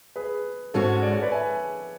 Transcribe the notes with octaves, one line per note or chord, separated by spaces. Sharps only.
G#4 B4
G#2 G#3 C#4 F#4 A4 C#5
D5
C#5
B4 D5
E5 G#5